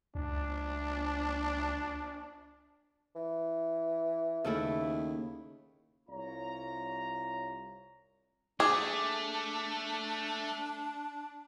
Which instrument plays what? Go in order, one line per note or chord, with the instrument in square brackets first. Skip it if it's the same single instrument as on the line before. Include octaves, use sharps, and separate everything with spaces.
[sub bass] C#2 [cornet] D4
[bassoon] E3
[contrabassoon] D#2 [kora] C#3 A3 E4
[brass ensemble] C2 F4 C#5 A#5
[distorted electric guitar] A3 [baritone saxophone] D4 [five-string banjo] G#4 [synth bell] D6